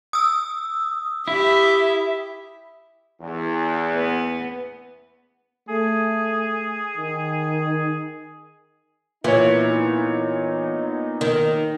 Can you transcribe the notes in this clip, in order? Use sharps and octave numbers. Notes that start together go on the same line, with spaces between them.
D#6 E6
E4 G4 E5
E2
B3
A3 G#4
D#3
A#2 E3 B3 D#4 C#5
D#3